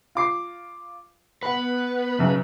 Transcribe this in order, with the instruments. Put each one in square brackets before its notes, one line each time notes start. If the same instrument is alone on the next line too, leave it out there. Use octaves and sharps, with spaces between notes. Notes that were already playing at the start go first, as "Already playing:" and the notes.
[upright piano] F4 D6 C7
[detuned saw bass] B3 [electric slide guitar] B4 [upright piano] F#5 B5
[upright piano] B1 F#2 [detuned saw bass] C#3